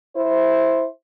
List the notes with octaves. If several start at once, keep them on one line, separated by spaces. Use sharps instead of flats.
E4 C5